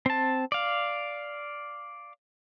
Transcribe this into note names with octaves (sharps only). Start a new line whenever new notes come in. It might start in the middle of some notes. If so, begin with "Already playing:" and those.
C4 A5
D5 F5